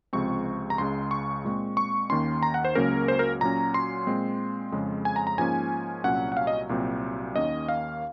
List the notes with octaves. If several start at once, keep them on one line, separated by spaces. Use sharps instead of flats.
C#2 C3 F3 G#3 C4 C#6
A#5
C#2 C#3 G#3 C6
C#6
A#2 G#3 C4
C#6
D#2 D#3 A#3 C#4 C6
A#5
F#5
C5
C#2 C#3 F#3 A#3 C#4 A#4
C5
A#4
A#2 F#3 C#4 A#5
C6
A#2 G#3 C4
F2 C#3 G#3
G#5
A#5
A#5
G#2 F3 A#3 C#4 G#5
C2 A#2 F#3 C#4 F#5
F#5
F5
D#5
C2 A#2 F#3 C4
D#2 D#3 A#3 C#4 D#5
F5